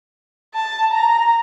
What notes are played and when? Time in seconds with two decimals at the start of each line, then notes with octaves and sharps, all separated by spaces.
0.55 A5
0.92 A#5